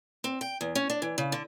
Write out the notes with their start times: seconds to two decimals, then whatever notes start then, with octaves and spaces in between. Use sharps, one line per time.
0.24 C4
0.41 G5
0.61 E2
0.75 C#4
0.90 D4
1.02 E3
1.18 C#3
1.32 D3